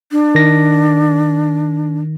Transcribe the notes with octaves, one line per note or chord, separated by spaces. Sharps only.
D4
D#3 A#6